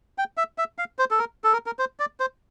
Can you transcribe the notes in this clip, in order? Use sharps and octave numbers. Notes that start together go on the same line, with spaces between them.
G5
E5
E5
F5
C5
A4
A#4
A4
A#4
A#4
C5
D5
C5